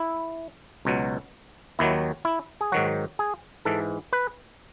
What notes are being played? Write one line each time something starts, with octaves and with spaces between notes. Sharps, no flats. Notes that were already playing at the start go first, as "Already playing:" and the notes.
Already playing: E4
C#2 B2 F#3
D#2 D#3 F#3 E4
E4
G#4
G#2 D#3 F#3 F#4
G#4
G#2 E3 A4
B4